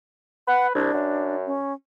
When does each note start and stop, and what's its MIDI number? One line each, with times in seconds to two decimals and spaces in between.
0.47 0.72 71
0.47 0.67 78
0.75 0.92 36
0.75 1.35 62
0.93 1.55 42
1.46 1.73 61